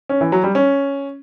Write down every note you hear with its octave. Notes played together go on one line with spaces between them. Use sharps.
C#4
E3
F#3
G3
C#4